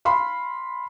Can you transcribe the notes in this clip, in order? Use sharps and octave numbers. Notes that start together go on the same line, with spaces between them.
F5 B5 C6